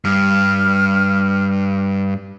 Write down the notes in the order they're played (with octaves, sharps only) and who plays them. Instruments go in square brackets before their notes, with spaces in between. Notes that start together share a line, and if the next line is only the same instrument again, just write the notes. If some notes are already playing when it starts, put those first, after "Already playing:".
[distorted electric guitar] G2 [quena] F6